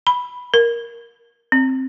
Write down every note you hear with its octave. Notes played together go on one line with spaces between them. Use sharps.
B5
A#4
C4